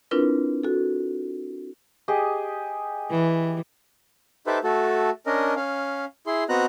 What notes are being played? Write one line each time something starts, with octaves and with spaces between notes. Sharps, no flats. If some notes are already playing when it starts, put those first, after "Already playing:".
C4 D4 E4 F4 A#4 B4
F#4 A4
G4 G#4 D#5
E3
D#4 G4 A4 B4 C5 E5
A3 F#4 A4
C#4 D4 A#4 D#5
C#4 F5
E4 G#4 C6
B3 C4 F#4 D#5 A#5 F#6